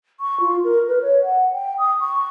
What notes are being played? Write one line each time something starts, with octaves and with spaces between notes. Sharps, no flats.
C#6
F4
A#4
B4
C#5
F#5
G5
D#6
C#6